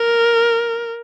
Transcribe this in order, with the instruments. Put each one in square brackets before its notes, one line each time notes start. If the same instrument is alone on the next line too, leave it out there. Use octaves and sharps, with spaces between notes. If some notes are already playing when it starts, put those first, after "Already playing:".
Already playing: [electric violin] A#4